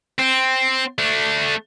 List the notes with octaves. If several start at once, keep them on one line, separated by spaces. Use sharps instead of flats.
C4
A3 D4